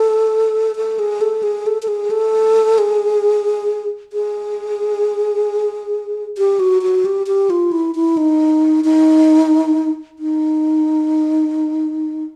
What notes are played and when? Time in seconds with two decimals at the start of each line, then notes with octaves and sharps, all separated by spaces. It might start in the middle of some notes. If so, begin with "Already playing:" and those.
Already playing: A4
0.76 A4
0.99 G#4
1.21 A4
1.43 G#4
1.66 A4
1.83 A4
1.88 G#4
2.11 A4
2.78 G#4
4.13 G#4
6.38 G4
6.60 F#4
6.82 F#4
7.05 G4
7.27 G4
7.50 F4
7.72 E4
7.95 E4
8.17 D#4
8.85 D#4
10.19 D#4